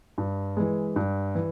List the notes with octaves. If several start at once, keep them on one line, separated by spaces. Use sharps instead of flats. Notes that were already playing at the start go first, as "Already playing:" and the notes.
G2
E3 G#3
G2
E3